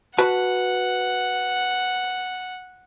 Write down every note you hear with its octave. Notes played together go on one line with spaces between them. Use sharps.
F#4 B4 F#5 A5